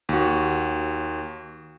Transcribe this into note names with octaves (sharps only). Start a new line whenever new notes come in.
D#2 F#4